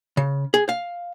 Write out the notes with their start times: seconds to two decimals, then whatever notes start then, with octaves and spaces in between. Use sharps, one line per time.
0.17 C#3
0.54 G#4
0.69 F5